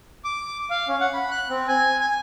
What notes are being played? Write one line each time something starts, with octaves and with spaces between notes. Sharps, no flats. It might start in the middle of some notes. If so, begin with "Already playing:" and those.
D6
F5
C#4
F#5
B5
F#6
C4
G#5
G#5